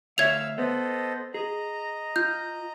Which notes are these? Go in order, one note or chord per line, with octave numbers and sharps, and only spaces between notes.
D2 C#5 E5 F5 E6 G#6 F7
B3 A4 C5 D#5
G#4 D#5 A#5
F4 G6